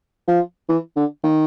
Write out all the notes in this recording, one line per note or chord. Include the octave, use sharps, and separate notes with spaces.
F3
E3
D3
D#3